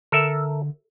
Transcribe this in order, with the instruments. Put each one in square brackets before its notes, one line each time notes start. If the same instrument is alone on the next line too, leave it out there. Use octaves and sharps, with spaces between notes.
[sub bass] D3 [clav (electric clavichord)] A4 A#4 E5